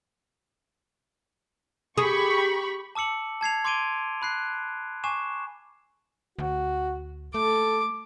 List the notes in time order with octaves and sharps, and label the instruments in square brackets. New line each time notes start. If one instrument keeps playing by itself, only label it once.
[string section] G4 B5 C#6 [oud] G#4
[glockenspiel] A5 D6 E6 C#7 F#7
A5 G#6 C7 F7
C6 D6 G#6 D7 D#7 G7
B5 F#6 C7
G#5 C#6 D6 C7 E7
[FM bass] D2 [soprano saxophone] F#4
[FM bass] A3 [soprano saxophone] A4 [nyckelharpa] D6